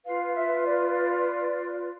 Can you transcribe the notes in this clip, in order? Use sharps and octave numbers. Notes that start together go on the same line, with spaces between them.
F4 B4 F5
E5
D5